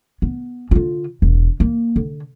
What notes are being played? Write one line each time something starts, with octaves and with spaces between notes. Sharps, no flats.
B3
D3 F4
E1
A#3
D3